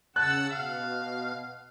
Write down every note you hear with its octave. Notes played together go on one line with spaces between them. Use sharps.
C#3 F#5 A5 E6 F#6
B2 F5